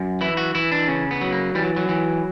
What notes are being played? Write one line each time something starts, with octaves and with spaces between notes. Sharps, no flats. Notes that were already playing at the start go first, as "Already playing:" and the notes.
Already playing: F#2
E3 E4
F#4
E3 E4
D4
C#3 C#4
B3
F#3
A#3
E3 G3
F#3
F#3
E3